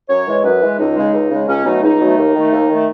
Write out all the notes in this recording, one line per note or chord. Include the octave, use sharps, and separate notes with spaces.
F#2 C#5
E3 G#3
F#2 B4
E3 G#3
C#2 D#4
C#3 G#3
C#2
C#3 G#3
C#2 C#4
B2 F#3 A3 D#4
C#2 D#4
B2 F#3 A3
D#2
D#3 A3
D#2
D#3 A3